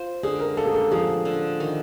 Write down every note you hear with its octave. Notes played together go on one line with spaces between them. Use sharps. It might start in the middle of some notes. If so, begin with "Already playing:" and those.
Already playing: F4 C5
D3 G#4
A#4
A#3 A4
G#4
A4
F3 G#4
D3
D#3